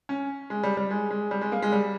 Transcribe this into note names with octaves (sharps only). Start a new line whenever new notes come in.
C#4
G#3
G3
G3
G#3
G#3
G3
G#3
A#3
G#3
G3